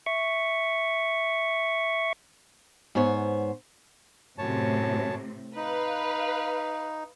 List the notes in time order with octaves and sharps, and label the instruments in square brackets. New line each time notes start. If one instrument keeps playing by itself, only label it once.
[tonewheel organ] E5 C#6
[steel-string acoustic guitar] G#2 B3 C5 C#5
[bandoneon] F#2 C#5 A5 [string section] A2 C3
[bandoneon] D#4 [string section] B4 F5